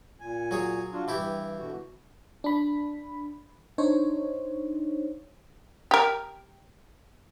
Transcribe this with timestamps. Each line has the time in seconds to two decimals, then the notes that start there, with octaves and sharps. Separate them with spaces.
0.20 A#2 G#5
0.51 F#3 G#4 C#5
0.92 D4 F4 F#4
1.08 G2 E3 E4 G4
1.58 B2 D3 F#4
2.44 D4 B5
3.78 D4 D#4 C5 C#5
5.91 G4 A#4